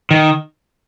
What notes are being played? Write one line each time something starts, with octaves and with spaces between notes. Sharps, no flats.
D#3